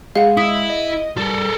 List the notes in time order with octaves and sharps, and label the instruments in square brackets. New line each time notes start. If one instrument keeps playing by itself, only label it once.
[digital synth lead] G#3 [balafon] G#4 [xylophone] F5 F#5
[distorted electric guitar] E4 [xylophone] D#6
[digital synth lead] D#5
[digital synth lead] G3 [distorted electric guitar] A4 A#4